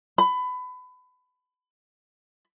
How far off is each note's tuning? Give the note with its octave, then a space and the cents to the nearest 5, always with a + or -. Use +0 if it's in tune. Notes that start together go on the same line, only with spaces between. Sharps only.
B5 +25